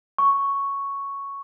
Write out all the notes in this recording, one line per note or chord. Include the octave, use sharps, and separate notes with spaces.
C#6